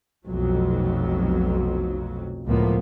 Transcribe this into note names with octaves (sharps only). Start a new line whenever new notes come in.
F1 B1 F2 F#3
C#2 A2 F3 A#3 B3